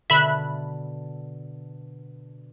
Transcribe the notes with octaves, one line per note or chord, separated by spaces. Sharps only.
B2 D3 A4 E5 B5 F#6